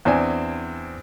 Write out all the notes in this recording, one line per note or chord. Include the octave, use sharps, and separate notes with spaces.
E2 C4 D4 G#5